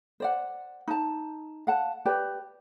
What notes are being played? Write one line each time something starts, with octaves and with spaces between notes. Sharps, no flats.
C5 D5 F#5
D#4 A5
F5 F#5 A5
G4 B4 D5